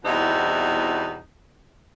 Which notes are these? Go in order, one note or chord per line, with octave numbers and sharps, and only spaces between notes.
E2 B2 G3 C4 D#4 E4